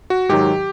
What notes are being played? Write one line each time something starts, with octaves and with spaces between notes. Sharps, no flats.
F#4
G#2 D#3 F#3 G4